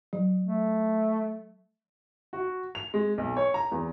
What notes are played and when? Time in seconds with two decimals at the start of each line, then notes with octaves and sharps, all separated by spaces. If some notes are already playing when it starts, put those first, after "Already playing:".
0.13 F#3
0.44 A3
2.33 F#4
2.75 F7
2.94 G#3
3.18 B1
3.37 C#5
3.54 A#5
3.72 E2